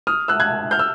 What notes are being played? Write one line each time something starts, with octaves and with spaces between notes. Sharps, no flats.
D#6 F6
E6 F#6
F#6 G#6
F6 G6
E6